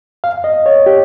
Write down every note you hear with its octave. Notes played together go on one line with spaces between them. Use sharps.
F5
D#5
C#5
G4